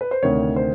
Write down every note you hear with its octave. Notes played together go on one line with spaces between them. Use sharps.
B4
C5
D2 C3 D#3 C#5
C5